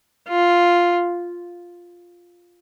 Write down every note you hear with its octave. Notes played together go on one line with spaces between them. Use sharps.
F4